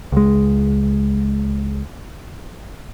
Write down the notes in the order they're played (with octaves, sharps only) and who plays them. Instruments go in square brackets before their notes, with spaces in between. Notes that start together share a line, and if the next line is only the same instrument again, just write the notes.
[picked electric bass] C#2 G#3